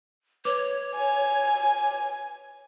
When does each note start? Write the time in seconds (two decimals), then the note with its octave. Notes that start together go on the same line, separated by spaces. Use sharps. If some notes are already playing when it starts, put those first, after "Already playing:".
0.45 B4 C#5 D6
0.95 G#5